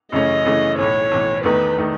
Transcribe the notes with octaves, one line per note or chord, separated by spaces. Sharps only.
F#2 C#3 E3 A3 C#4 D#5
F#2 C#3 E3 A3 C#4
B1 A2 E3 C#5
B1 A2 E3
E2 D#3 A3 D#4 B4
D#3 A3 D#4